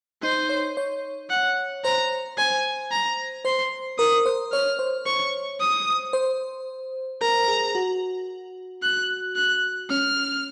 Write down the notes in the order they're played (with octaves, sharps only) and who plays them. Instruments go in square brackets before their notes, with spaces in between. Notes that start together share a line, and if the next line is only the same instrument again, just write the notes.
[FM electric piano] D#4 [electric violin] C5
[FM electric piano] C#5
C#5
[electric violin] F#5
[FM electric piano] C5 [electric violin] A#5
[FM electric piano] C5 [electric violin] G#5
[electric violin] A#5
[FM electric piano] C5 [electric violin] C6
[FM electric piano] A#4 [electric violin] D#6
[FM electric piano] C5
[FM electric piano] C#5 [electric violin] F6
[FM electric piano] C5
[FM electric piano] C5 [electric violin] C#6
[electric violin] D#6
[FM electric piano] C5
[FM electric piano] A#4 [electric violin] A#5
[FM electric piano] G#4
F#4
[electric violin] F#6
F#6
[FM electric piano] C#4 [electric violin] F6